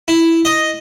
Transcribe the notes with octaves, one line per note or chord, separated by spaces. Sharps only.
E4
D#5